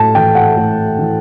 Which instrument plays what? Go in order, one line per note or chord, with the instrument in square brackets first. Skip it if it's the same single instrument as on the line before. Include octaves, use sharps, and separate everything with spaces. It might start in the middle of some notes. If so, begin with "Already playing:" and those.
Already playing: [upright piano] A2 A5
E3 G5
F#5
A2
E3